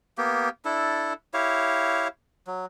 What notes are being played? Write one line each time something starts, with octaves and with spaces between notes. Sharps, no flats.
A#3 B3 G4
D4 E4 A4
E4 G4 C#5 F5
F#3